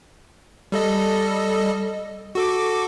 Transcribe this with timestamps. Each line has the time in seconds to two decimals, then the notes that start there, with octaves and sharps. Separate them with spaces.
0.72 G3 A4 D#5
2.35 F#4 A4 D6